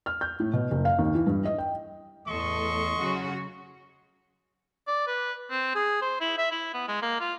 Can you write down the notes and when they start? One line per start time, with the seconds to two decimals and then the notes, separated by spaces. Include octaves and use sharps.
0.06 F6
0.21 G6
0.40 A2
0.53 B2
0.71 F#1
0.85 F5
0.99 D#2
1.14 E3
1.27 G2
1.45 D#5
1.58 G5
2.28 E2 A2 A4 D#5 C6 C#6
2.98 C#3 F#3 F#4
4.88 D5
5.07 B4
5.51 C4
5.75 G#4
6.02 C5
6.21 E4
6.38 E5
6.51 E4
6.74 B3
6.88 G#3
7.02 A#3
7.21 F4